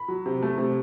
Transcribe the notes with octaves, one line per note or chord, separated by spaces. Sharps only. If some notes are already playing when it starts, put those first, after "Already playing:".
Already playing: B5
F#3
C3
A3
C3